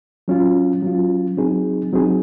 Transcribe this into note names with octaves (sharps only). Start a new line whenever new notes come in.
F#3 C#4 F4
F#3 C#4 F4
F#3 C4 D#4 G#4
F#3 C4 D#4 G#4